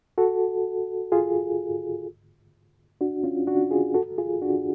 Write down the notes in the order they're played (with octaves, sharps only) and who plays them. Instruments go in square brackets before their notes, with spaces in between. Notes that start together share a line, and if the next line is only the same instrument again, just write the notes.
[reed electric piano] F#4 A4
F4 G#4
D4 F#4
C#4 F4
D4 F#4
F4 G#4
F#4 A4
F4 G#4
D4 F#4